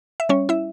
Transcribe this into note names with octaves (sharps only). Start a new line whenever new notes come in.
E5
G3 C#4 C#5
E4 E5